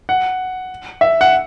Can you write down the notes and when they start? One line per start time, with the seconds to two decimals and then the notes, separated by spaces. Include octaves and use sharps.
0.09 F#5
1.01 E5
1.21 F#5